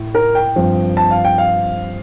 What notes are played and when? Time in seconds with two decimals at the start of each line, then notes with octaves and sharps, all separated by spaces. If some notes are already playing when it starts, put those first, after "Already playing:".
Already playing: A2
0.15 A#4
0.35 G5
0.56 G2 F3 C4
0.97 A5
1.11 F5
1.25 G5
1.38 F5